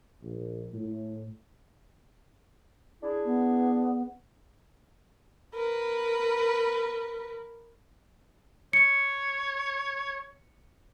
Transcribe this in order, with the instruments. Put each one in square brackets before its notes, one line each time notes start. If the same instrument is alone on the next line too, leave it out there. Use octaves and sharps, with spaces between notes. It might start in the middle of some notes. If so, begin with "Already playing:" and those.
[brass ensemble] A#1
A2
[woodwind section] D4 E4 G#4
[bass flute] B3
[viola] A#4 B4
[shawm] C#5 [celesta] C#7